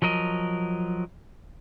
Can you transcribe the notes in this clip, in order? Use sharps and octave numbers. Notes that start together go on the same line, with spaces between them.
F3 F#3 A#4 D#5